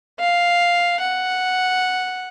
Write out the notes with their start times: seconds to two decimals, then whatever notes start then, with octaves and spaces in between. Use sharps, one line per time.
0.19 F5
1.00 F#5